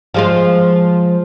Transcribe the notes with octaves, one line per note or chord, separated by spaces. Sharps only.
F3 G#3 F4